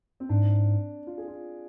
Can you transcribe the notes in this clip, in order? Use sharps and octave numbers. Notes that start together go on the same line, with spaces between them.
C4
G#2 D4
F4
G#4
F4